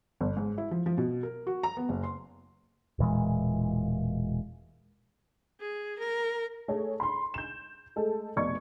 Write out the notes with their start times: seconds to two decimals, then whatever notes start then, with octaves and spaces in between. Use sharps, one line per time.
0.21 G1
0.37 G#2
0.58 E4
0.71 F3
0.86 F3
0.98 B2
1.23 A#4
1.47 F#4
1.63 A#5
1.77 B3
1.89 F#1
2.04 C6
2.99 E1 A#2 E3 G#3
5.61 G#4
5.99 A#4
6.68 A3 G#4 A4 C#5
7.00 B5 C6
7.34 G6 E7
7.96 G#3 A3 A4
8.36 F1 B2 D5 C#6 G#6